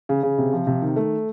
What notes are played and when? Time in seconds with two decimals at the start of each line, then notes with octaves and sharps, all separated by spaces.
0.09 C#3
0.23 C#3
0.38 C3
0.53 F3
0.67 C3
0.82 D#3
0.96 A3